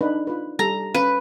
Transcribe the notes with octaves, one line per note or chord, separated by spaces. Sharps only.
D4 D#4 B4
F4 B4
G3 A4 A#5
C#4 B4 F5